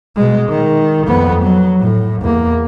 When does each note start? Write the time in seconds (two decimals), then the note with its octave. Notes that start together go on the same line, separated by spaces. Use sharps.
0.16 B2 G#3
0.49 D#3
1.07 F2 B3
1.43 F#3
1.80 A2
2.22 E2 A#3